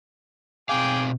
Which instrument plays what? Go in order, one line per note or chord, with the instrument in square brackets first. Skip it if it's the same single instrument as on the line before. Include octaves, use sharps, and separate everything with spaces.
[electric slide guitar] B2 C4 F5 [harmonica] G#4 G5 D6